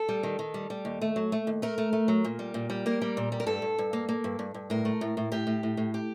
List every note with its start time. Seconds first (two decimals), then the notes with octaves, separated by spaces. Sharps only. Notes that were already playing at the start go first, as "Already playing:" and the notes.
Already playing: A4
0.09 G3
0.23 D#3
0.39 D#3
0.54 G3
0.70 G3
0.85 D#2
1.01 A3
1.16 F#3
1.32 A3
1.47 D#2
1.62 A3 A#4
1.78 A3
1.93 A3
2.08 F#3
2.24 A#2
2.39 G3
2.54 A#2
2.70 G3
2.86 A#3 A#4
3.02 G3
3.17 A#2
3.32 G3
3.40 A#4
3.46 G2 A4
3.62 G2
3.78 G2
3.93 A#3
4.09 A#3
4.24 G2
4.39 G2
4.54 G2
4.70 A2 A#4
4.85 A3
5.01 A2
5.17 A2
5.32 A2 G4
5.47 A2
5.63 A2
5.77 A2
5.94 G4